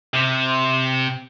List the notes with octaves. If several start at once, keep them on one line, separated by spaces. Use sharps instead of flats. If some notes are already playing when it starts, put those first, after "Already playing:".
C3